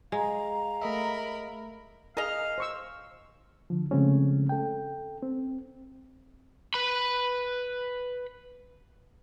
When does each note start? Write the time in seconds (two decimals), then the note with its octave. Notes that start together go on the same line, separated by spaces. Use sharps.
0.12 G#3 F5 A#5
0.82 A3 A#4 D#5 E5 B5
2.17 G#4 A#4 D#5 F5 A#5
2.58 C5 C#6 E6
3.70 D3 F3
3.91 C#3 F3 G#3 A3 C4 C#4
4.49 A4 G5
5.23 C4
6.74 B4 B5